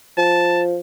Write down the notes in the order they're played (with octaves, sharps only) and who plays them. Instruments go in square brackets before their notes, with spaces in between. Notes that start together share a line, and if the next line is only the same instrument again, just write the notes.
[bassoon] F3 [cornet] A5